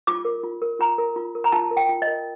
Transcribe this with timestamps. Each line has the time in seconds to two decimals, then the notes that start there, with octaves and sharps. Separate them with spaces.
0.07 F4 D6
0.25 A#4
0.43 F4
0.62 A#4
0.79 F4 A#5
0.98 A#4
1.16 F4
1.35 A#4
1.44 A#5
1.52 F4 A5
1.71 A#4
1.77 G5
1.89 F4
2.02 D#5
2.07 A#4